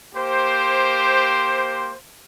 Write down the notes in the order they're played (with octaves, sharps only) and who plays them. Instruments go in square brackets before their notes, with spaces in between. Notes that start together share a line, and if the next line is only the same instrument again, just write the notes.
[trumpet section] A#3 G4 C5